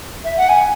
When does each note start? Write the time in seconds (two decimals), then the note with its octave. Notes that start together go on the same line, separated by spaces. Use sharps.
0.24 E5
0.37 F#5
0.48 G#5